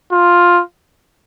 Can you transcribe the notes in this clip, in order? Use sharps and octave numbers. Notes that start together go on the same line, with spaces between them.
F4